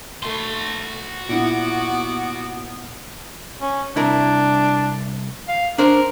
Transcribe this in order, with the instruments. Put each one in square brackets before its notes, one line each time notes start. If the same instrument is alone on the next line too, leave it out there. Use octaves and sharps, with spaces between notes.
[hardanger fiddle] A3 [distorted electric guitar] F#4 C6
[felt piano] A#2 E4 [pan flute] B3 [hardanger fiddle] F#5 D6
[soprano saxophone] C#4
[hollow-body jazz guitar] C2 E4 A#4 [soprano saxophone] D4
[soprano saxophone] F5
[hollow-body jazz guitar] D4 C5 [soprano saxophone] A#4